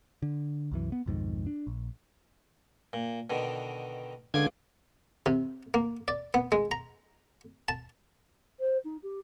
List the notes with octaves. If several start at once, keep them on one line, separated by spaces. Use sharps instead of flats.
D3
C2 F#2 E3
B3
B1 F2 G#2 D#3
D4
A#1
A#2
B2 D3 D#3
C#2 D3 F4 D6 G#6
C3
A#3
D5
B3
G#3
A#5
A5
C5
D#4
G4